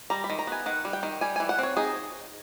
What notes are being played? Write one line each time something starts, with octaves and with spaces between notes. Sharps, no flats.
G3 A#5
B5
D#3
A#5
B3 G#5
D#3 F#5
G3
G5
D#3
G3 G#5
E3 G#5
F#5
C4 C#5
D#4 G#4